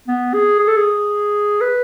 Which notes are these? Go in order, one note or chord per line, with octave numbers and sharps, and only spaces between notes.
B3
G#4
G#4
A4
G#4
B4